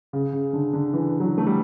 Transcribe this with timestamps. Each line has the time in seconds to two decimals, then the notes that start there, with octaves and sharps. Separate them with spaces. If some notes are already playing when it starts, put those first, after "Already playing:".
0.13 C#3
0.33 C#3
0.53 D3
0.73 D3
0.93 E3
1.20 F#3
1.38 A3
1.47 G3